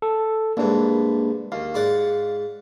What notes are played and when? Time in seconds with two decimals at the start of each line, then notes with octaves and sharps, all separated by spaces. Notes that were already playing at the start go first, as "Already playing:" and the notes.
0.02 A4
0.57 C2 G#2 A#3 D4 B4
1.52 D#2 F5
1.74 G#2 D5 F#5